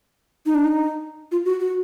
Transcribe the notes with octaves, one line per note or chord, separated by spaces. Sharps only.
D#4
D4
D#4
F4
F#4
F#4